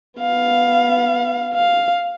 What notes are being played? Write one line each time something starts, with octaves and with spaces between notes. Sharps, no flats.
B3 F5
F5